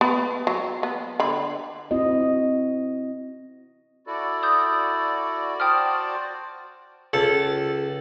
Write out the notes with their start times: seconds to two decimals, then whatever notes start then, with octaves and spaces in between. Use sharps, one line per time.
0.01 B3 B4
0.47 F#3
0.83 B3
1.20 D3 B5
1.91 C4 E4 F#4 D#5
4.07 E4 F#4 A4 D5
4.43 D#6 G6
5.60 C5 G5 A5 D#6 F6
7.13 C#2 A4